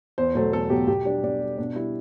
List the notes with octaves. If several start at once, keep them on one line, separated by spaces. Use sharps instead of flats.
E2 C5
B2 F#3 A3 C5
E2 A4
B2 F#3 A3 G4
B2 G4
G3 D4
B2 D4
G3
B2 D4
G3 E4